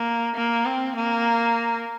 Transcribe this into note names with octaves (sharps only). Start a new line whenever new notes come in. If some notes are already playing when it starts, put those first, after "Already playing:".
Already playing: A#3
A#3
C4
A#3